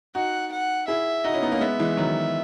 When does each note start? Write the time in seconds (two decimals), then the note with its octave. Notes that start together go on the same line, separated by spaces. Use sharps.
0.15 D#4 F#4 F#5
0.52 F#5
0.87 E4 G#4 E5
1.24 D#4 F#4 D#5
1.33 C#4 E4
1.42 B3 D#4
1.52 A#3 C#4
1.61 G#3 B3 E5
1.79 E3 G#3
1.97 D#3 F#3